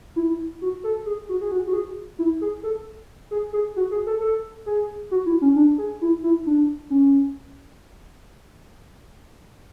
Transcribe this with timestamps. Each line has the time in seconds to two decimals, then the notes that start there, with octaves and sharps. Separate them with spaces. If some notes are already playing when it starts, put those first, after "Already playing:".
0.16 E4
0.62 F#4
0.84 A4
1.06 G#4
1.29 F#4
1.41 G#4
1.52 F#4
1.67 F#4
1.73 G#4
2.19 E4
2.41 G#4
2.63 A4
3.31 G#4
3.53 G#4
3.76 F#4
3.91 G#4
4.07 A4
4.20 A4
4.66 G#4
5.11 F#4
5.26 E4
5.41 C#4
5.56 D4
5.78 G#4
6.01 E4
6.23 E4
6.46 D4
6.90 C#4